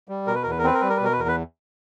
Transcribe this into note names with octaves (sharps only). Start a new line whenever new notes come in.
G3
B2 A#4
B4
A#4
E2 B4
A#4
C4 B4
A#4
G3 B4
A#4
B4
B2 A#4
B4
E2 A#4
B4